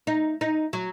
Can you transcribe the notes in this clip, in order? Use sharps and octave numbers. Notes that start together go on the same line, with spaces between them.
D#4
D#4
F#3